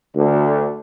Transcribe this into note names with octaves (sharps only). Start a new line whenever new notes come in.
D2 D3